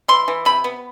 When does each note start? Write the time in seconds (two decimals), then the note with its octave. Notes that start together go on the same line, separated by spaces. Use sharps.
0.08 E3 C6
0.28 E3
0.45 C3 B5
0.64 B3